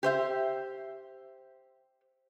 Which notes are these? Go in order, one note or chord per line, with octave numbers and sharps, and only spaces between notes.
G4 C5 E5